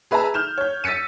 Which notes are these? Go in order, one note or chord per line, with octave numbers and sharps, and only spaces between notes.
G#4 B4 E5 A5 A#5
F6 G6 E7
C#5 G6
E6 A6 B6 C#7 D#7